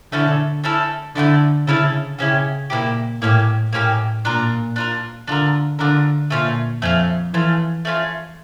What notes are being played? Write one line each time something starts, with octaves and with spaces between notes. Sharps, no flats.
D3 A3 C#4 E4 A4
A3 C#4 E4 A4
D3 A3 C#4 E4 A4
C#3 A3 C#4 E4 A4
C#3 A#3 C#4 E4 G4
A#2 A#3 C#4 E4 G4
A2 A#3 C#4 E4 G4
A2 A#3 C#4 E4 G4
A#2 D4 F4 A#4
D4 F4 A#4
D3 D4 F4 A#4
D3 D4 F4 A#4
A#2 A3 C#4 F4
F2 A3 C#4 F4
E3 A3 C#4 F4
A3 C#4 F4